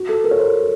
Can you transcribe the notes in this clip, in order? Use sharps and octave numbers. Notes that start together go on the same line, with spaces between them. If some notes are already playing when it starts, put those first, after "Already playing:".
Already playing: F#4
A4
A#4
C#5
C5